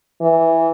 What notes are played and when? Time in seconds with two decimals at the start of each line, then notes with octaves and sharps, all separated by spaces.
0.21 E3